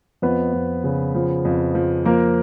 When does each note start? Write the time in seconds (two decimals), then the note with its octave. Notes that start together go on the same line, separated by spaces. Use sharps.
0.22 F2 B3 B4
0.53 F2
0.84 C#3
1.15 F3
1.45 F2
1.75 F3
2.05 F3 A#3 A#4